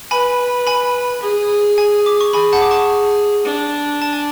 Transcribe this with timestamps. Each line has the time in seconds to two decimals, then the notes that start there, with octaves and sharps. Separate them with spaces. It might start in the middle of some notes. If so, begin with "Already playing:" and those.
0.11 B4 G#5 B5
0.67 G#5 B5
1.22 G#4
1.78 G#5
2.06 D6
2.21 C#6
2.33 G#4 G#5 B5
2.53 F#5 A5
2.62 D6
2.71 A5 C#6
3.46 D4
4.02 A5
4.13 G#5